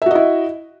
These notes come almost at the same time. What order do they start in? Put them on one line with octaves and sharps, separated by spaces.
E5 F#4 D#5 E4